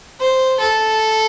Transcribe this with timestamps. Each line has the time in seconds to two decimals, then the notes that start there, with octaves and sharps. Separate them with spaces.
0.20 C5
0.60 A4